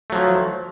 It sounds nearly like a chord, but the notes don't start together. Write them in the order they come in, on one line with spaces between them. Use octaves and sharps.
A3 F#3 F3